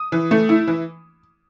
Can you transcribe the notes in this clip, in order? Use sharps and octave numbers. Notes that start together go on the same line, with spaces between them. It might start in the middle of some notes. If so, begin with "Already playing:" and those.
Already playing: D#6
E3
A3
E4
E3